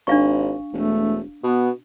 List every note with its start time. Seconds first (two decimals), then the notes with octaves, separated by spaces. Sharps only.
0.07 G#1 D4 F5 C#6
0.73 E1 A3
1.44 B2 B3